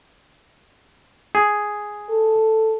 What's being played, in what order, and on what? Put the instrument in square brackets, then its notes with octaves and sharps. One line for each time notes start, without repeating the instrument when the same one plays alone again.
[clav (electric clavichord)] G#4
[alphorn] A4